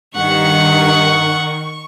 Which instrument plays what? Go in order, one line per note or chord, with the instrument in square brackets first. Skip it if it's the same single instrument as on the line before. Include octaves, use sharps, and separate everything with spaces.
[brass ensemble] G2 [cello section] D#3 [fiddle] F#5 [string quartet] C#6